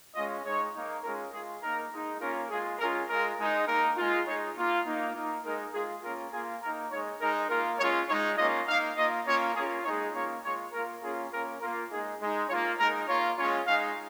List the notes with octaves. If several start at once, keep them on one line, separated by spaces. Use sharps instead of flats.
G#3 C#4 F4 D#5
G#3 D#4 C#5
A#3 D#4
G#3 C#4 F4 A#4
G#3 F4 G#4
A#3 D#4 A#4
G#3 D#4
A#3 C#4 F4 A#4
G#3 F4 G#4
G#3 C#4 F4 A#4
G#3 F4 A#4
G#3 D#4
A#3 D#4 A#4
G#3 F4
G#3 D#4 C#5
A#3 F4
A#3 D#4
A#3 D#4
G#3 D#4 A#4
G#3 F4 G#4
A#3 C#4 F4 A#4
A#3 F4 G#4
A#3 D#4 A#4
G#3 D#4 C#5
G#3 D#4 A#4
A#3 F4 A#4
G#3 C#4 F4 C#5
G#3 D#4 C#5
A#3 C#4 F4 D#5
A#3 D#4 F5
A#3 F4 D#5
A#3 C#4 F4 C#5
A#3 C#4 F4 G#4
G#3 D#4 C#5
A#3 C#4 F4 C#5
G#3 F4 C#5
A#3 F4 A#4
A#3 C#4 F4 G#4
A#3 C#4 F4 A#4
A#3 F4 A#4
G#3 D#4 G#4
G#3 D#4
A#3 F4 C#5
G#3 D#4 A#4
A#3 F4 C#5
G#3 C#4 F4 C#5
G#3 D#4 F5